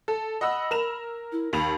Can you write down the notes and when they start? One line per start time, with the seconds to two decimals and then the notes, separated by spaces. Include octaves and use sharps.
0.08 A4
0.41 D#5 F#5 B5 E6
0.71 A#4 E7 F7
1.32 E4
1.53 D#2 B5 F7